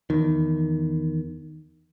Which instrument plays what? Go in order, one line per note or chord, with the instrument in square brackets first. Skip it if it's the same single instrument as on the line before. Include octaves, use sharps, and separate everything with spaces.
[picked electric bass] E2 D#3